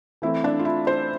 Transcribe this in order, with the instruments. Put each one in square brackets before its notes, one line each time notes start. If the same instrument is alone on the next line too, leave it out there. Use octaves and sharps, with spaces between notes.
[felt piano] E3 A3 C4 E4
D4
F4
E4
C5